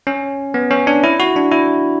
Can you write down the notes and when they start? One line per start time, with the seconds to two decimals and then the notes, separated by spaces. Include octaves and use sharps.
0.07 C#4
0.54 B3
0.71 C#4
0.87 D4
1.04 E4
1.20 F#4
1.36 D4
1.51 E4